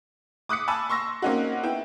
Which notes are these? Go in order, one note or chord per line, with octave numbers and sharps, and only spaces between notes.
D6 D#6 F#6 B6 C#7
G#5 A5 B5 D6 E6
C6 C#6 E6 A#6
A#3 C4 C#4 D#4 F#4
B3 E4 G5